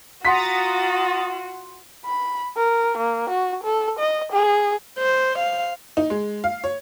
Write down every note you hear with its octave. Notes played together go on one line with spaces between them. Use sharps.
F4 F#4 F#5 A#5 C6 D#6 A6 B6
B5
A#4
A#3
F#4
A4
D#5
G#4
C5
F5
D#4
G#3
F5
C#5